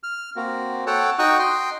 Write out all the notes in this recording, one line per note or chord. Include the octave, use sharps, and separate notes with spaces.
F6
A#3 C4 F#4
A4 C#5 F#5 G5 A5
D#4 F#4 G5 C#6 D#6 F#6
D#5 G5 C6